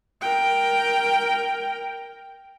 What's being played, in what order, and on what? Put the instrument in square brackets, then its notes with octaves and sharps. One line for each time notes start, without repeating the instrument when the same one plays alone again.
[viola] A#4 G5